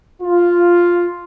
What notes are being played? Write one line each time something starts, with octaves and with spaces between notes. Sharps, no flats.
F4